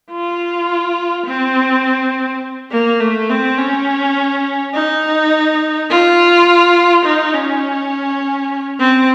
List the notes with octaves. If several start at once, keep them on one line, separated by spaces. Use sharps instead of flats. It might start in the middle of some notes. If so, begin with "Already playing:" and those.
F4
C4
A#3
A3
C4
C#4
D#4
F4
D#4
C#4
C4